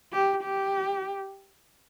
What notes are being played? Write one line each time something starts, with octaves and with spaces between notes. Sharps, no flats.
G4
G4